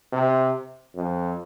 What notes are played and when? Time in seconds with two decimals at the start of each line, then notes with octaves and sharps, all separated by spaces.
0.13 C3
0.95 F2